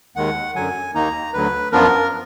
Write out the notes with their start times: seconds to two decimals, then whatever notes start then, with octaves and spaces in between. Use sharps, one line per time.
0.16 D#2 D#3 G#3 F#5
0.55 F#2 D3 F#3 G#5
0.95 D#2 D#3 A#3 D#4 A#5
1.33 D2 D3 F#3 B4
1.72 F#2 F3 B3 D4 F4 A#4